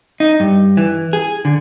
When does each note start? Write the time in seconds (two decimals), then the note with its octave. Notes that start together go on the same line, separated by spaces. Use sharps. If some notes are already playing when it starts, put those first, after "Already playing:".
0.20 D#4
0.40 G2
0.77 E3
1.13 G#4
1.45 D3